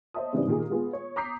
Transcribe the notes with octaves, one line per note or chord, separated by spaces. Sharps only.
C5 C#5 D#5 E5 A5 D#6
G#2 C#3 E3 G3 C4 D4
A#2 D#3 A#3 G4 G#4
G#3 B3 F4 G#4
C#5
A#5 D6 D#6 G6 B6 C7